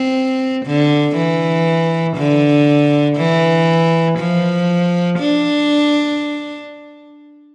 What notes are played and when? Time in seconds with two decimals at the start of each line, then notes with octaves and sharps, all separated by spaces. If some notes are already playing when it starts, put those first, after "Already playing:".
Already playing: C4
0.66 D3
1.15 E3
2.17 D3
3.17 E3
4.19 F3
5.19 D4